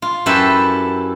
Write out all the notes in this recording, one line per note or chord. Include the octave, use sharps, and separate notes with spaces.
F4
F#2 E4 G4 A4 B4 E5